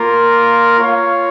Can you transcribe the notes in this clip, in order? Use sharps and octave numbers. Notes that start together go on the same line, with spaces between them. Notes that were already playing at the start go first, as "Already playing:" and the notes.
Already playing: A#3 F4 A#4
F4 C#5 F5